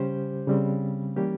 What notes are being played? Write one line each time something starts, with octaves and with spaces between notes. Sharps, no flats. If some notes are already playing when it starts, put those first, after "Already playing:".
Already playing: C#3 G3 C#4 G4 C5
C#3 G3 C4
E3 G3 A#3 C#4 G4